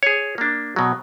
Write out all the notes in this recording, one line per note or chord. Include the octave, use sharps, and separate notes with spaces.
G#4 C#5
A#3 D4
B2 F#3